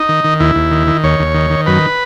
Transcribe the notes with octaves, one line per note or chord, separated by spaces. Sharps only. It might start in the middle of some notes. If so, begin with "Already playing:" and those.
Already playing: D#4
D#3
D#3
D#2 E4
D#2
D#3
D#3
D#2 C#5
D#2
D#3
D#3
F#2 B4